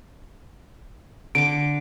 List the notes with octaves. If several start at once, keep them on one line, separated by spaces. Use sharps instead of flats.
D3 D6 D7